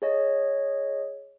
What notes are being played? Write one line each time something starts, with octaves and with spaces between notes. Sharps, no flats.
G#4 C#5 D#5